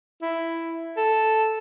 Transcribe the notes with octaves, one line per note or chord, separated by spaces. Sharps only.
E4
A4